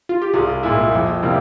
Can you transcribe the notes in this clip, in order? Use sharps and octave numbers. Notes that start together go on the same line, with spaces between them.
F4
G4
C2 F4 G#4
A#2 G#3 E4
F2
C3 G3 A#3 E4